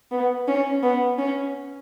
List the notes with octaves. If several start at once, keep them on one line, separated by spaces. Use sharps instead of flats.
B3
C#4
B3
C#4